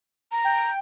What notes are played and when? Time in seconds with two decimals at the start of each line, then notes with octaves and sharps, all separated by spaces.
0.32 A#5
0.44 G5